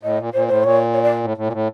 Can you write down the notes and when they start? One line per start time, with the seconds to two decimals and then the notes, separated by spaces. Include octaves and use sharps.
0.03 A2 D#5
0.19 A#2
0.34 A#2 C5
0.48 A2 C5
0.63 A#2 C#5
0.93 C#5
1.03 D5
1.24 A2
1.37 A2
1.47 A#2
1.52 A2